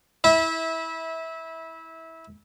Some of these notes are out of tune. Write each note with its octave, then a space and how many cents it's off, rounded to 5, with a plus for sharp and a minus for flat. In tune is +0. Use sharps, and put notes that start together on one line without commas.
E4 -20 E5 -25